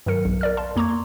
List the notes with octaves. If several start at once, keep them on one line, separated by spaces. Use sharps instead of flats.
G2 D#3 F#3 A#4 C#7
B1 E2
A#4 D5 F6
F5 A5 C6
F2 A#3 A#5 C#6 D6 G#6
C6